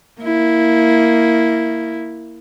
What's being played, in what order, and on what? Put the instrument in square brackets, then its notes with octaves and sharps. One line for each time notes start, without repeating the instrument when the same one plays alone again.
[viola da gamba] A#3 E4